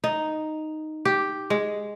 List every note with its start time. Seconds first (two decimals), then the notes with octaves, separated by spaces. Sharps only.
0.04 D#4
1.05 G4
1.50 G#3